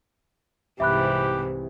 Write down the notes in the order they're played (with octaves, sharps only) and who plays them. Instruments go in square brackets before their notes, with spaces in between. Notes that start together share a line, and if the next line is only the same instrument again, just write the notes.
[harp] C2 [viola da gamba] G#2 C3 E3 [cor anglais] G4 [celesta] E5 B5 F#6